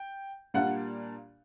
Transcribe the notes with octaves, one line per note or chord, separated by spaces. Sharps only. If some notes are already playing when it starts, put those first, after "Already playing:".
Already playing: G5
A#2 G3 A#3 D4 F#5